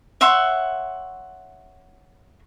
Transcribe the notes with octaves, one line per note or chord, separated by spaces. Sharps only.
C#5 E5 F#5 C6